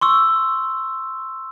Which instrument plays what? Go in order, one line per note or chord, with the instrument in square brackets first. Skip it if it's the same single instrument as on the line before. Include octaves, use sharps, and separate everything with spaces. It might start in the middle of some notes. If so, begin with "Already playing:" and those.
[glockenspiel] C6 C#6 E6